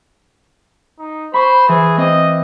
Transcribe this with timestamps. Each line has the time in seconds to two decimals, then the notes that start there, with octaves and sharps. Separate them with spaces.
0.99 D#4
1.34 C5 B5 C#6
1.69 E3 G#4
1.98 C4 D#5 D6